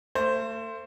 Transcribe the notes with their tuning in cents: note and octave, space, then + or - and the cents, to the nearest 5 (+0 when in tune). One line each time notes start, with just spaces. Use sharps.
A3 +35 C5 +0